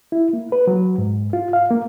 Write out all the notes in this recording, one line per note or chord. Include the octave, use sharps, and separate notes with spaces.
E4
A#3
B4
F#3
G#2
F4
F5
A#3